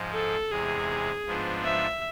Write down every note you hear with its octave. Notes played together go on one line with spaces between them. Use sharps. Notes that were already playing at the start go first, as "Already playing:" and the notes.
Already playing: G#2 F3 G#3
A4
E2 C3 G#3 G#4
G#2 F3 B3 D4 F4
E5